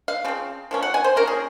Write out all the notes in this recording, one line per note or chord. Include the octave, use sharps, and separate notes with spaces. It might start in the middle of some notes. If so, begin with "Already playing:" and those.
F5
C#3 F3 C4
F3 A#3 C#4
F#5
G#5
C5
F3 A#3 C#4 A#4
G#4